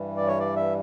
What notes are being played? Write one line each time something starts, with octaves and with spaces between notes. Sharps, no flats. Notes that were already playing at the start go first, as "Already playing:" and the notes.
Already playing: G2 E3 G3
D5
C#5
D5
E5